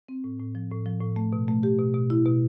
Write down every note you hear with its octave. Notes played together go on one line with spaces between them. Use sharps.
C4
A2
A2
F3
A2
F3
A2
A3
B2
A3
G4
B2
B2
E4
B2